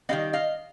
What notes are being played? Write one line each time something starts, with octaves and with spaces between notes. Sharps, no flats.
D#3 G3 B3 D#5 F5
D#5 F5